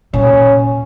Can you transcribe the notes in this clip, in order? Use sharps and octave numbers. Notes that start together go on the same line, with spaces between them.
A#2 C#4